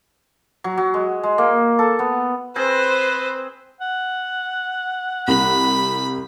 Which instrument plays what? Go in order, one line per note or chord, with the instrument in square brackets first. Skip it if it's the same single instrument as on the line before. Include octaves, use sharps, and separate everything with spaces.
[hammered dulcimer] F#3
F#3
G#3
G#3
A#3
A4
B3
[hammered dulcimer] C4 G#4 [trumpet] B4 [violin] C5
[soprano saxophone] F#5
[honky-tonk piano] C2 [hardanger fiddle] B5